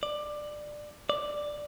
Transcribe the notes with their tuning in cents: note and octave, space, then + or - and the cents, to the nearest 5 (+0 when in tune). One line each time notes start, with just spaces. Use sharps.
D5 +15
D5 +5